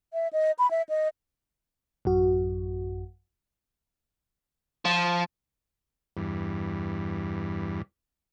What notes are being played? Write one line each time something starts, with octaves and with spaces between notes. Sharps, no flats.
E5
D#5
B5
E5
D#5
A1 F#2 F#4
F3
E2 G2